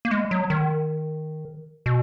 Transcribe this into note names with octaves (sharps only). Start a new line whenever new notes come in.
A#3
G#3
F#3
D#3
B2